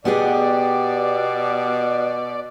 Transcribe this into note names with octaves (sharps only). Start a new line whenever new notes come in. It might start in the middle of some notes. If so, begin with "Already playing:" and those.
B2 B3 G4 G#4 D5